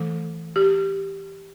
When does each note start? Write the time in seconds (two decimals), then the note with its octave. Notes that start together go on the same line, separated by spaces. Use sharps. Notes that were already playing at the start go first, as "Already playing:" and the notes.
Already playing: E3 A3 A4
0.56 G4